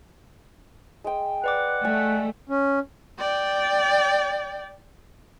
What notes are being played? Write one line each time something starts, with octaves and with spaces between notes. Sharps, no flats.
G#3 G5
B4 D5 F#5 D6
A3 D5 G#5
C#4
D5 G5